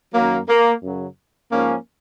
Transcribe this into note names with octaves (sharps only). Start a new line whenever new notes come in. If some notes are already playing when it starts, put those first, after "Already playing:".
F#2 D#3 F#3 A#3
A#3
F#2 C#3 F#3
G#2 F3 A#3 C#4